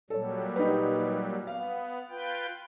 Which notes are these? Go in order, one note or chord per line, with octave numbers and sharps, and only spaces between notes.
A#2 F#3 G3 A4 C#5
D#4 G4 B4
B3 F5
F4 B4 G5